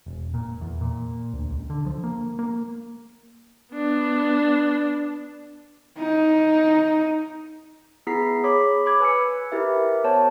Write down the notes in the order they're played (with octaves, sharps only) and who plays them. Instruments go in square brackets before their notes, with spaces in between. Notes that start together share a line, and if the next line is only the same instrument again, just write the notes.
[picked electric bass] E1
A#2
E2
A#2
D2
C#2
D3
F3
A#3
A#3
[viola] B3 D4
[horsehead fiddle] D#4
[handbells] B3 E4 G#4 A#5 B6 C7
G#4 C#5 B5 D6 B6
B5 D6 G#6
B4 G#5 E6 C#7
E4 G4 A#4 B4 E5
B3 C5 C#5 A5